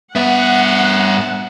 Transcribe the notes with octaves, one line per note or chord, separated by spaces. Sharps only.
G2 B3 E5 F#5